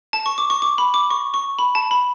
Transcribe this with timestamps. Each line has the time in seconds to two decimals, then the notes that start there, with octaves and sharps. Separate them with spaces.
0.13 A5
0.26 C#6
0.38 D6
0.50 C#6
0.62 D6
0.78 B5
0.94 D6
1.10 C#6
1.34 C#6
1.59 B5
1.75 A5
1.91 B5